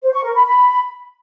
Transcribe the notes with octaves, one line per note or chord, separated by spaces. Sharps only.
C5
C#6
A#4
B5
B5